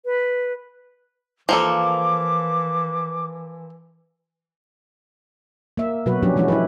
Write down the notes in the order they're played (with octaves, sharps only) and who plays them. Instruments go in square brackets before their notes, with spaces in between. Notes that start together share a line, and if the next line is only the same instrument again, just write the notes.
[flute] B4
[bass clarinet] E3 [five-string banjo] F3 A#3 A4 [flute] D6
[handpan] A#3 E5
B2 F#3 F#4 B4
F3 F#3 C#4 D4 G4
E3 G#3 C#4 E4 F#4
E4 G4 B4